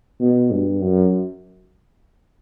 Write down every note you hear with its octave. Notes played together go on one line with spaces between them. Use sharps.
B2
G2
F#2